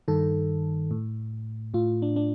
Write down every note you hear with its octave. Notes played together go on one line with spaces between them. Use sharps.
G2 D#3 A4
A2
A2 F4
D4
D4